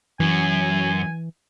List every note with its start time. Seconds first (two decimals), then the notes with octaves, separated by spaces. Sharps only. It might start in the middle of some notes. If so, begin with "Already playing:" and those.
0.20 F#2 E3 G#5